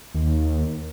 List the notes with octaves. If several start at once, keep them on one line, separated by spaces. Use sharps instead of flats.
D#2